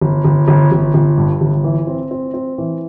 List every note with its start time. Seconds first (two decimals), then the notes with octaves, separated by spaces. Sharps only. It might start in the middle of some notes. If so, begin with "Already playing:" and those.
0.01 G1
0.25 G1
0.48 G1
0.72 G1
0.94 G1
1.17 G2
1.41 G1
1.64 E3
1.87 C4
2.11 C4
2.34 C4
2.58 E3